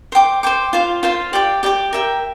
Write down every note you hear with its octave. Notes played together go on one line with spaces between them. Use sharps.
C5 G5 D6
C5 G5 D6
F4 C5 F5
F4 C5 F5
G4 D5 G5 D6
G4 D5 G5 D6
A#4 E5 G5